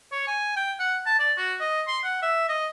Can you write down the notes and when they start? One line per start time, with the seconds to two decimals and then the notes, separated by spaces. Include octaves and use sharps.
0.12 C#5
0.27 G#5
0.56 G5
0.80 F#5
1.06 A5
1.19 D5
1.37 F#4
1.60 D#5
1.87 C6
2.04 F#5
2.22 E5
2.49 D#5